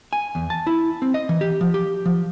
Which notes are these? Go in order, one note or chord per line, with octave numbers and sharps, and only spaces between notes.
G#5
E2
A5
E4
C4
D#5
E3
G4
F3
G4
F3